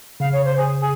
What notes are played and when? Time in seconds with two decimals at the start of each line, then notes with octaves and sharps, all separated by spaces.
0.20 C#3 F5
0.32 C#5
0.44 C5
0.57 G#4
0.80 G#4